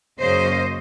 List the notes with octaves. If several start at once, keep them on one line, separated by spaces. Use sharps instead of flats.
F#2 C#3 F#3 A#3 C#4 C5 D#5